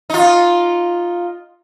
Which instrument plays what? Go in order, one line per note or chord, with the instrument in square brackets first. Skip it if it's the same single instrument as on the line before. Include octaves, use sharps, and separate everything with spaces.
[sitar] D#4 F4